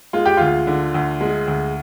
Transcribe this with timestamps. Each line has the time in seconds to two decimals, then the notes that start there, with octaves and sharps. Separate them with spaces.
0.13 G#3 F4
0.26 G4
0.37 D2 F4
0.67 D3
0.94 D2
1.21 G#3
1.48 D2